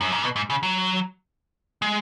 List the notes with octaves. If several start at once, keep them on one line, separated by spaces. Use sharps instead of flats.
F#2
G#2
B2
G#2
C#3
F#3
G#3